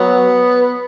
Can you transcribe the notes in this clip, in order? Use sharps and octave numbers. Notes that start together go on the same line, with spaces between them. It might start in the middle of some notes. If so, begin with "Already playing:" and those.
Already playing: F#3 B3